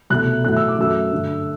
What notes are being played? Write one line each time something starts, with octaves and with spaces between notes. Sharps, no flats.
C2 B2 A3 F#6
A2 F#3 A3 F#6
E6
D6
F#2 F#3 A3 E6
G2 D3 A3